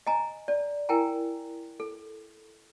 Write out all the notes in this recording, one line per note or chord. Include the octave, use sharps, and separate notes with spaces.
D#5 G#5 A#5
D5
E4 A#4 G5 G#5 A#5
A4